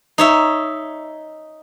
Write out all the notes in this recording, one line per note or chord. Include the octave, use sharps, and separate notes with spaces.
D#4 C#5 E5